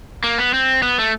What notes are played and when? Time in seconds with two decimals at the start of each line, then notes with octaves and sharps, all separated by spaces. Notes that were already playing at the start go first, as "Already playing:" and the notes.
0.24 A#3
0.38 B3
0.54 C4
0.82 B3
0.98 A3